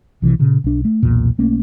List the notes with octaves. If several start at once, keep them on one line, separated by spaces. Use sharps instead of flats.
B1 C3 E3
A#2 C#3
B1 D4
A3
B1 E2 A#2
B1 A3 A#3 C#4